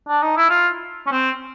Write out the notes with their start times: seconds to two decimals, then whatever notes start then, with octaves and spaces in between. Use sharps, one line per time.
0.09 D4
0.22 D#4
0.37 E4
0.50 F4
1.07 C#4
1.11 C4